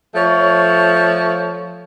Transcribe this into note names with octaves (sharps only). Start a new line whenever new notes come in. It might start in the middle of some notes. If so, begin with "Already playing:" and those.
F3 A3 C#5